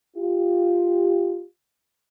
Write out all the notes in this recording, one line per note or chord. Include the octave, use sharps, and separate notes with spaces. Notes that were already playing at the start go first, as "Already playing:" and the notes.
F4 G4